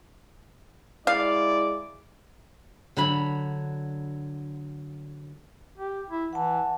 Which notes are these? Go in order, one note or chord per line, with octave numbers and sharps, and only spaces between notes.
G#3 E4 D5 F5
D3 F#3 B5
G4
E4
E3 F#5 A5